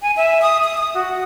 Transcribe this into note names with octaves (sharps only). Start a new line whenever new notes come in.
G#5
E5
D#6
D#6
D#6
F#4